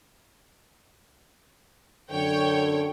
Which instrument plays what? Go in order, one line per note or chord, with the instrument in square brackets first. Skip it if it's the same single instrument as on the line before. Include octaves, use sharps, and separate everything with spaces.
[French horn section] F#2 D3 A4 [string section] C#5 G5